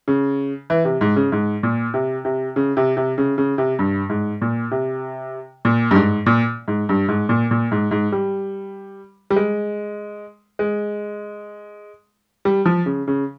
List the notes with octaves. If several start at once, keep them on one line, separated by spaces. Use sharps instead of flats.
C#3
E3
C3
G#2
C#3
G#2
A#2
C3
C3
C#3
C3
C3
C#3
C#3
C3
G2
G#2
A#2
C3
A#2
G2
G#2
A#2
G#2
G2
G#2
A#2
A#2
G#2
G#2
G3
G3
G#3
G#3
G3
F3
C#3
C#3